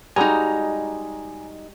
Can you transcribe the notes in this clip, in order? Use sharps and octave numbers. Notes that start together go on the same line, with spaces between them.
G3 G#3 D#4 F#4 G#5 A#5